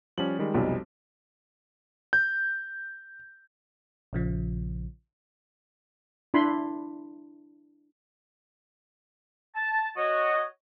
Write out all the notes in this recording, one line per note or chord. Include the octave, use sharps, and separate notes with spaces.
F3 G3 C#4 F#7
D#3 G3 G#3
F1 B1 F3 G3
G6
A#1 C#3 F3
D4 E4 B5 C6
A5
F#4 C#5 D#5